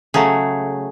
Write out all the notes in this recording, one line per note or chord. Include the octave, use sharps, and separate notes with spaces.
C#3 F#3 A3 G#4